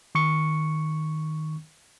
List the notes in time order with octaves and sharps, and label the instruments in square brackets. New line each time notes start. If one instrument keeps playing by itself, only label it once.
[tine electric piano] D#3 C#6 C#7